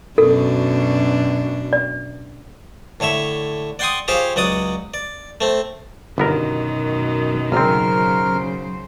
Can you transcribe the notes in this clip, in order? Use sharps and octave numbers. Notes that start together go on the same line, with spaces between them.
F#2 B2 D4 A4
D5
A2 D3 C#5 E5
D5 F#5 G5 C6 C#6 D#6
F4 G4 G#4 C5 C#5 F5
C#2 F#3 D5 F#5 D#6
D5
A3 C4
G1 F#2 B2 D#3 B3 A#4
G#1 D2 C#3 F#3 C4 A#4 C5 F6